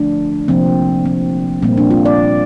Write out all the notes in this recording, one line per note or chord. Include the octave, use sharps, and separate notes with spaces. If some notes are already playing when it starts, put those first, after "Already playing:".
Already playing: D3 F3 A3 D4
C3 F3 A#3 C4
C4
A#2 G3 A#3 C4
D4
F4
D5